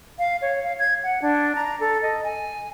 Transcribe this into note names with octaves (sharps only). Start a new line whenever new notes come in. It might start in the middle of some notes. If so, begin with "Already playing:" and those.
F5
C#5
F5
G#6
F#5
D4
A#5
A4
D#5
G#5